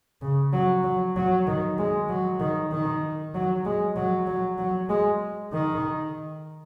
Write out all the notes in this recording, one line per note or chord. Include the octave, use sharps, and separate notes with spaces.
C#3
F#3
F#3
F#3
D#3
G#3
F#3
D#3
D#3
F#3
G#3
F#3
F#3
F#3
G#3
D#3